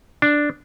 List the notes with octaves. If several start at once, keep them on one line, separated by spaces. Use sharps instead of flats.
D4